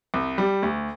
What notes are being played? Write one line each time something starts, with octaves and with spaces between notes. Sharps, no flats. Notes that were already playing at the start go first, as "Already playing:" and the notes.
C2
G3
D2